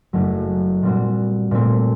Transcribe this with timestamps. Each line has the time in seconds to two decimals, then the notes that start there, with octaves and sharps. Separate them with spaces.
0.13 F#1 F#2 F#3 A3
0.83 A#2 G3 C4 F#4
1.51 A#2 A3 C4